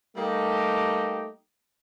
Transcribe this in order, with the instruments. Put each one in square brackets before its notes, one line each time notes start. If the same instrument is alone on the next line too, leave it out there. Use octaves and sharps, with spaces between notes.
[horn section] G3 A3 A#3 D#4 G4